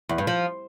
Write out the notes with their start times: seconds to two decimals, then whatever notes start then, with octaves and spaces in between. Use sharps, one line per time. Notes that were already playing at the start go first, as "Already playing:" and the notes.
0.09 E2
0.18 G2
0.27 F3